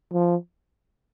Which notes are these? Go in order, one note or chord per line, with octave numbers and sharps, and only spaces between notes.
F3